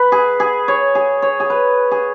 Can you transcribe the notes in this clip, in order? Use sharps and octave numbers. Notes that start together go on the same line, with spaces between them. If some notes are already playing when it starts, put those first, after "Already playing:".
Already playing: B4
G#4
G#4
C#5
G#4
C#5
G#4
B4
G#4